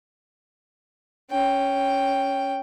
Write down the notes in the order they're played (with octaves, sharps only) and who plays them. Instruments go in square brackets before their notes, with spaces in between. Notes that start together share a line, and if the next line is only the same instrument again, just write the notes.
[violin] C#4 G5